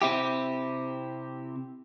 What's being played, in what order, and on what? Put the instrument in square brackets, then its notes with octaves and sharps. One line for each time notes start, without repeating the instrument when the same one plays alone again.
[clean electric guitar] C3 C4 E4 G4